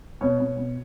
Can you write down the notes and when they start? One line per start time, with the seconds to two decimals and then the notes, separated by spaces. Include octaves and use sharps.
0.21 B2 C#5
0.39 B2
0.57 B2